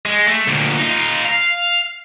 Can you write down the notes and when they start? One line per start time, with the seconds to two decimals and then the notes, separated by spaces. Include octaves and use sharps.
0.05 G#3
0.28 A3
0.48 D2 A#2
0.78 D#4 F4
1.25 F5